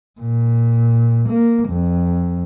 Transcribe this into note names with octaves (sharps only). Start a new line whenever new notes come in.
A#2
A#3
F2